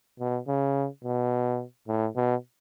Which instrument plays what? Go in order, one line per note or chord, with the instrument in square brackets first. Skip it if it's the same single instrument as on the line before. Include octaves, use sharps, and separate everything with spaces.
[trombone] B2
C#3
B2
A2
B2